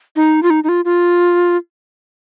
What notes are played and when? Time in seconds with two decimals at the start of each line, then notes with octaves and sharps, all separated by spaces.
0.16 D#4
0.43 F4
0.50 D#4
0.64 D#4
0.69 F4
0.85 F4